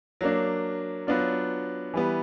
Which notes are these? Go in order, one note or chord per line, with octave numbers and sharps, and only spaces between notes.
F#3 A#3 D4
F#3 B3 D4 F4
E3 G3 B3